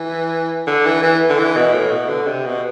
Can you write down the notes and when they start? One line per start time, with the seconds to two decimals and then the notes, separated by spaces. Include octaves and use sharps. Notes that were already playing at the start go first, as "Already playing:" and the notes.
Already playing: E3
0.67 D3
0.86 E3
1.03 E3
1.30 D3
1.39 E3
1.56 B2
1.73 A2
1.92 B2
2.09 D3
2.27 C3
2.45 B2